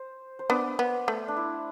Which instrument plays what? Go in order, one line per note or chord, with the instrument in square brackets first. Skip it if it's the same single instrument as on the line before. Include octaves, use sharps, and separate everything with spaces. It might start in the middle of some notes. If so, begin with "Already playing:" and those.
Already playing: [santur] C5
C5
[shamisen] B3 D4 [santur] D5
[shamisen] B3
A3
[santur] D4
E4